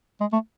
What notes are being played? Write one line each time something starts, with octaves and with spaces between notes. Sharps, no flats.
G#3
A3